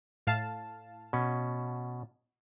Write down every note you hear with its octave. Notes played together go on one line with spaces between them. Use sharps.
A2 F5 A5
B2 C#4